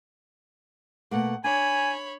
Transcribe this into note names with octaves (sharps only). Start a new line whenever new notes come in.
B2 A3 A#3 F#5
D4 C#5 G#5 B5